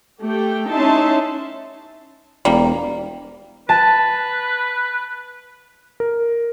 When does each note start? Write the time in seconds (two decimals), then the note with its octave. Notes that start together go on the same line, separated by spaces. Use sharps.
0.21 A3 G4 G5
0.71 C#4 D#4 E4 E5 A5 C6
2.45 E1 G3 A#3
3.69 B4 A5
6.00 A#4